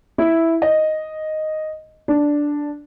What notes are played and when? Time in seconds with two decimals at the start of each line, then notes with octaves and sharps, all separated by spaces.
0.18 E4
0.62 D#5
2.08 D4